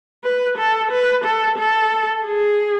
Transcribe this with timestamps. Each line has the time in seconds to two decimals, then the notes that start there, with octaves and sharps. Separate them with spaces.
0.24 B4
0.58 A4
0.91 B4
1.24 A4
1.58 A4
2.25 G#4